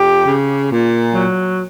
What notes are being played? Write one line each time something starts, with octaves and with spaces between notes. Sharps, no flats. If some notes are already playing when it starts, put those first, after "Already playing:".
Already playing: F2 G4
C#3
A#2
F#3